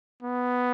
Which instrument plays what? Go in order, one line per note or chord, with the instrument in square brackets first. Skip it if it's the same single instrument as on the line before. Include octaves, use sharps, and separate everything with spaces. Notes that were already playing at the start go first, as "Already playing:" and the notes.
[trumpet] B3